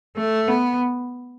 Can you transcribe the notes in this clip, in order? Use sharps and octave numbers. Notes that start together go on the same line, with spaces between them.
A3
B3